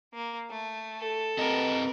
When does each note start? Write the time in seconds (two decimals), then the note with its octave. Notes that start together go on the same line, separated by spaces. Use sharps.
0.13 A#3
0.50 A3
0.98 A4
1.38 C4 G4 A#4 B4 D#5